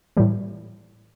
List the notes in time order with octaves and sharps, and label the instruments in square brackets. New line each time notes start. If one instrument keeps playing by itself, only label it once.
[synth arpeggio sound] A2 E3 G3